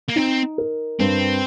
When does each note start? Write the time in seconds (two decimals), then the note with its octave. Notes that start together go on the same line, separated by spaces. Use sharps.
0.08 A#3
0.16 C4 D#4
0.58 A#4
1.00 G2 C4